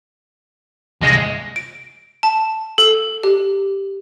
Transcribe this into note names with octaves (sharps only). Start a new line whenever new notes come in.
C2 G2 G#3 A#6
D7
A5
A4
G4